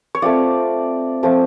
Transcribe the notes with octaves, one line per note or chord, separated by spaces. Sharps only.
C#5
A3 C4 F4 D5
F3 A3 C4 F4